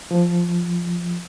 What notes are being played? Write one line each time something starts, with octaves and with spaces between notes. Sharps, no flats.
F3